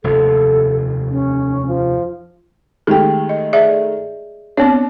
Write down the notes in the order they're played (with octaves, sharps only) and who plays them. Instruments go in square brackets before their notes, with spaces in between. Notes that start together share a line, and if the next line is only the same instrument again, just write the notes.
[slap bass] F1 D#2 [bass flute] A4
[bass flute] C#4
F3
[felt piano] D#3 G#3 A3 [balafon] G4 G5
[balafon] D#5
G#4 D5 E5
[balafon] B3 C4 C#5 [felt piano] D4